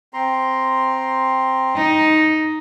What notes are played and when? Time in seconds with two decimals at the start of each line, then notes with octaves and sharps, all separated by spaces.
0.14 C4 A#5 C6
1.75 D#4